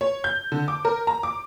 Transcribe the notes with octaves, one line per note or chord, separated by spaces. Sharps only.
C#5
G6
D3
D6
A#4
A#5
D6